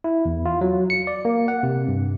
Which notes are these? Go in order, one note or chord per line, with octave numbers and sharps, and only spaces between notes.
E4
E2
F4
F#3
C#7
D5
A#3
F#5
C3
G2